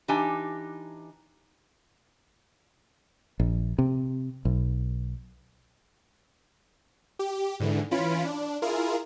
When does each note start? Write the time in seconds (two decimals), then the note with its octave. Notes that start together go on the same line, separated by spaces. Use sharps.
0.08 E3 D4 D#4 G4 G#5
3.40 A#1
3.79 C3
4.45 B1
7.19 G4
7.60 G#2 D3 E3
7.91 E3 C#4 F4 B5 D7
8.25 D4
8.62 E4 F4 G#4 A#4